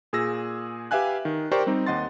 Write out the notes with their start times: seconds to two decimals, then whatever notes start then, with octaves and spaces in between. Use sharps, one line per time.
0.13 A#2 G#4 E6 A#6
0.91 G4 B4 E5 F5 G#5 F#6
1.25 D#3
1.52 G4 A#4 C5 D5 G5 C#6
1.67 G3 C4 D#4
1.86 D#2 D#5 F#5 C6 A6